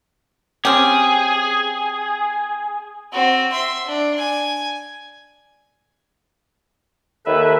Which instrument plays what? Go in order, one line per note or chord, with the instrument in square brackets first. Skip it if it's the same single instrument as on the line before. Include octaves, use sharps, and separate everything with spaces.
[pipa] C4 C#4 G4 [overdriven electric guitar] G#4
[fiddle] C4 F#4
E5 C6
D4
G#5
[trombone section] D#2 A4 [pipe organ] B4 E5